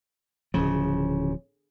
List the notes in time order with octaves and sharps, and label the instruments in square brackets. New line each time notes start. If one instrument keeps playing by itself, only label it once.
[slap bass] D1 F3 [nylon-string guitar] C#3